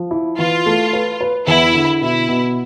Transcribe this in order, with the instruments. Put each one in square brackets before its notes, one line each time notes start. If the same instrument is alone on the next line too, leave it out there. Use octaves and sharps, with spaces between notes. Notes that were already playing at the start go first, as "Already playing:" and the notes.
Already playing: [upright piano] F3
E4
[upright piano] E3 [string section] F4
[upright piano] A3
B4
B4
[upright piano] E2 [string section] E4
[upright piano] D3
[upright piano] B2 [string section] E4
[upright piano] B2